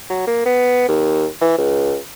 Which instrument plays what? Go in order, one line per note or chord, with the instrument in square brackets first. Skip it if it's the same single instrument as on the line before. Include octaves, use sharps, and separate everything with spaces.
[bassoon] F#3
A#3
B3
D#2
E3
C#2